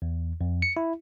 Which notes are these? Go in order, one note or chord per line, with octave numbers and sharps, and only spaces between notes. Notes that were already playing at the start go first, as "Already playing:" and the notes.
E2
F2
C#7
E4